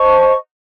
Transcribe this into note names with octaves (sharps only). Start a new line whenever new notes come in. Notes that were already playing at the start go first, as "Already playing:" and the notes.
Already playing: C5 D#5 A5 C#6